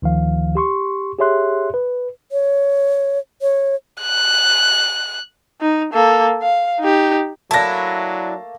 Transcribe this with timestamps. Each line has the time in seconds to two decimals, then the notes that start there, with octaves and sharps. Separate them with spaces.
0.02 D2 D#3 F3 F5
0.55 G4 C6 C#6
1.19 G4 G#4 C#5 E5 C6 F#6
1.74 B4
2.32 C#5
3.42 C#5
4.01 F#6
5.61 D#4
5.93 A#3 A4
6.42 F5
6.80 D#4 G4
7.51 F#3 A3 A#3 D4 E4 F5 A5 A#6